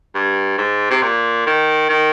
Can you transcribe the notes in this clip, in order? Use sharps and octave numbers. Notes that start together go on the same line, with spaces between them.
G2
G#2
C3
A#2
D#3
D#3